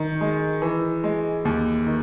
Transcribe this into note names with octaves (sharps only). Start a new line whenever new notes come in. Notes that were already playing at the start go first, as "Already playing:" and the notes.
Already playing: D#3
G#3
E3
G#3
D#2
D#3